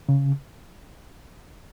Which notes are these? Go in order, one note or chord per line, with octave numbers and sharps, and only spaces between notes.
C#3